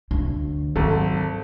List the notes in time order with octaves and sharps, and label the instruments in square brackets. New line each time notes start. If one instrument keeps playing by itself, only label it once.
[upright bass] D2
[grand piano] G#1 A4 [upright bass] F#3